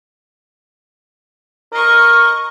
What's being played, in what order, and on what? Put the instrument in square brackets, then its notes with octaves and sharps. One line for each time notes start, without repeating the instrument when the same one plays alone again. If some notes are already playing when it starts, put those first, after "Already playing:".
[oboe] A#4 [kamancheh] D#5 C#6